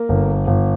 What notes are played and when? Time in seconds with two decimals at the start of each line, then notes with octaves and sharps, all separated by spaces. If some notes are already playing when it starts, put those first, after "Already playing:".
Already playing: A#3
0.09 G1
0.47 G1